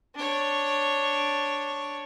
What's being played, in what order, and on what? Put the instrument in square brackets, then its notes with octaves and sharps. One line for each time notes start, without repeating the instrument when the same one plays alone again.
[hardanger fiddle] D4 C#5